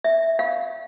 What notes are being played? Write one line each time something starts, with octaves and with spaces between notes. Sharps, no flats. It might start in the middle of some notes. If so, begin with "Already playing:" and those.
E5
F5